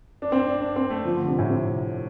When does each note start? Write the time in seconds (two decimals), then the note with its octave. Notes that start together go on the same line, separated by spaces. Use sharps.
0.22 D4
0.32 C4
0.47 D4
0.61 D4
0.76 C4
0.90 A3
1.05 F3
1.16 D3
1.28 C3
1.39 A2
1.49 C3